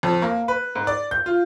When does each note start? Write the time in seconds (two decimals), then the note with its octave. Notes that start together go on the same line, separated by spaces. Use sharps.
0.03 F2
0.22 A#3
0.48 B4
0.75 G#2
0.87 D5
1.11 G6
1.26 F4